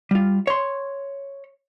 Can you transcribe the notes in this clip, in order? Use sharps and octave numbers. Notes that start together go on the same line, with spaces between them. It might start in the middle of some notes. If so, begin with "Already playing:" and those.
G3 F4
C#5 C6